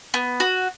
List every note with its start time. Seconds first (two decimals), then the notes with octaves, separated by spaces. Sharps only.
0.14 B3
0.40 F#4